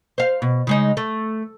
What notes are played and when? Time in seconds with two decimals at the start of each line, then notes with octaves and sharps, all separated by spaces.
0.18 C5 F5
0.42 B2
0.67 C#3 G#3 D#4
0.97 A3